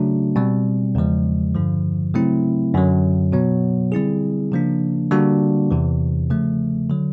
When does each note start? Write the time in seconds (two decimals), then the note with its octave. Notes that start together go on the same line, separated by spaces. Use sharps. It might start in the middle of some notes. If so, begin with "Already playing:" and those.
Already playing: C#3 F#3 A3 D4 F#4
0.36 B2 G3 C4
0.95 E2 C#3 F3 G#3
1.55 G2 D3 F3
2.14 C#3 F#3 A3 C4 E4
2.74 F#2 D3 F#3
3.32 B2 F#3 B3
3.92 D3 G3 C4 E4 G#4
4.52 C#3 F3 A#3 D4
5.11 D3 G3 A#3 D4 F#4
5.71 E2 C3 E3
6.30 C#3 F3 A3
6.90 D3 F#3